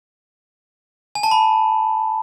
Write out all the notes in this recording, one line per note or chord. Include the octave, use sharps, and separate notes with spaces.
G#5
A5
B5